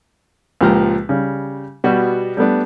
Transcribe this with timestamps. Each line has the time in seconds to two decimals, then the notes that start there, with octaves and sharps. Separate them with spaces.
0.61 C#2 A#2 F3 G4 A#5 F6
1.09 C#3 G3
1.84 B2 G3 B3 F#4
2.37 G3 A3 B3 D4